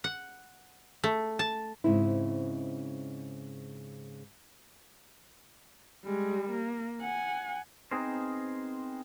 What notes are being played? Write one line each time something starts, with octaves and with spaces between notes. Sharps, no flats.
F#5
A3
A5
G#2 C#3 C4 D#4 E4
G3 G#3
A#3
F#5 G#5
B3 C4 D#4 G#4 A#4 C5